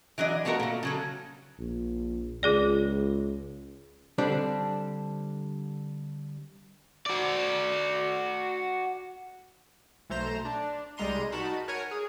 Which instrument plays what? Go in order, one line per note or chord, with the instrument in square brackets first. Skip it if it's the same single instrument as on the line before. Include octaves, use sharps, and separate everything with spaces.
[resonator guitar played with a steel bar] E3 F#3 D4 D#5
A3 B3 F4 F#4 A#4
A#2 A3
C#3 F#3 A4
[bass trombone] A#1
[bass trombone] C#2 [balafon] F4 G#4 D5
[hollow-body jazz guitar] D3 G3 C4 D4
[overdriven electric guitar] F#4 D5
[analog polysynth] B1 A3 C5 A#5 E7
D4
C2 G3 G#3 A#5 C6 D#7
D#4 F#4 A#4 A5 B5
A#4 C#5 F#5 G#5
G#4